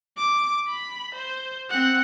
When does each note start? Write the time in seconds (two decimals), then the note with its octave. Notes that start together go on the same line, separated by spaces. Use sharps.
0.17 D6
0.68 B5
1.15 C5
1.70 C4 F#5